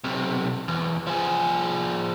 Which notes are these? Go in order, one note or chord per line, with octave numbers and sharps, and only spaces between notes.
B1 C3
E2
F3 G#4